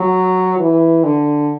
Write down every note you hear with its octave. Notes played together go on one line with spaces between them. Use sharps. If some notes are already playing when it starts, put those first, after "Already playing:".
Already playing: F#3
E3
D3